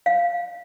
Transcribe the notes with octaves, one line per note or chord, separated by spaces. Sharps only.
F5